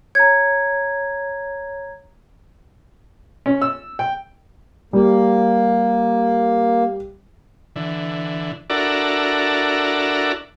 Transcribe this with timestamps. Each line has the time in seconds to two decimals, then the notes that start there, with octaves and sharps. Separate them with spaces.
0.15 C#5 A#5 G#6
3.46 C#4
3.62 E6
3.99 G5
4.93 G3 A#3
7.76 D3 E3
8.70 D4 E4 F#4 A4 A#4 D5